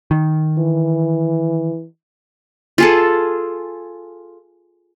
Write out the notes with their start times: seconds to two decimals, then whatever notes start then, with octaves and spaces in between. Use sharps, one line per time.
0.11 D#3
0.58 E3
2.78 F4 G#4 A4